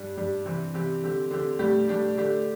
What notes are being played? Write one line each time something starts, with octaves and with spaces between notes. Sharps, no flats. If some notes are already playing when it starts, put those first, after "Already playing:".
Already playing: G2 G3 D4 G4
G2 G3 D4 G4
C3 E3 C4 G4
C3 E3 C4 G4
D3 C4 G4
D3 C4 G4
A2 G3 D4 G4
A2 G3 D4 G4
D3 A3 D4 G4